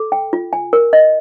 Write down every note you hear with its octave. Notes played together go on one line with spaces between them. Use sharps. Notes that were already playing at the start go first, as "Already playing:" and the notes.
Already playing: A4
G5
F4
G#5
A#4
D#5